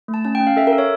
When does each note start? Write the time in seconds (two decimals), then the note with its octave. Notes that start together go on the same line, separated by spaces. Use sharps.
0.08 A3
0.14 A5
0.25 C#4 A5
0.35 G5
0.40 C#4
0.47 F5
0.57 A4 E5
0.67 A#4
0.73 A4
0.78 C#5